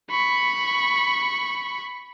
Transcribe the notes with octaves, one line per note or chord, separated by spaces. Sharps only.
B5 C#6